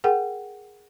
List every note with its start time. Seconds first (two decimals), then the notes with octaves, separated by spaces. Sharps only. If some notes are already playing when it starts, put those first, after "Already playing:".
0.04 G#4 A#4 F#5 G5